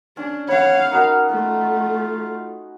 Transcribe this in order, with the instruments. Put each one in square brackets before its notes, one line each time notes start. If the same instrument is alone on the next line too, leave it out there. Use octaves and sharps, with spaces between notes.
[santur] C#4 [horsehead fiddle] D4
[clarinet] C#5 [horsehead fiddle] F5 F#5 [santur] B5
[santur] D#4 F#4 [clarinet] A#4
[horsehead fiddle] A3 [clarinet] F4